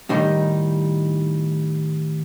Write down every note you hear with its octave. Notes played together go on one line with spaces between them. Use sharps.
A2 D#3 G3 D#4